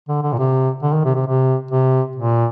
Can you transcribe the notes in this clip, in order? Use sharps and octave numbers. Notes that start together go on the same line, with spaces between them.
D3
D3
A#2
C3
D3
D#3
C3
C3
C3
C3
A#2